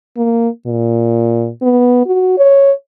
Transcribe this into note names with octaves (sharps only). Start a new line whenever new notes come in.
A#3
A#2
B3
F#4
C#5